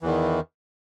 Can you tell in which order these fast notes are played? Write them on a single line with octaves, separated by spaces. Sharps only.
E3 E2 D#3